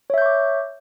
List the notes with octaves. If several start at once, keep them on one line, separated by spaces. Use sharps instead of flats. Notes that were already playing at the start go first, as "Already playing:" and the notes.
C#5 E5 C#6 D6 G6